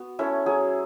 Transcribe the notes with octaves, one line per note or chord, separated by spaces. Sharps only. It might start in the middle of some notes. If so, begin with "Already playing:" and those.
Already playing: B3 F#4
A3 C#4 E4
F#3 G#4